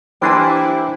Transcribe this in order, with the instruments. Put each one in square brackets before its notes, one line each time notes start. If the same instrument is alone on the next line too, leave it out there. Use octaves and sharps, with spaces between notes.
[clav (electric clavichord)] E3 A#3 D4 [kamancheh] E4 [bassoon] G4 [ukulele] B4 C5 G#5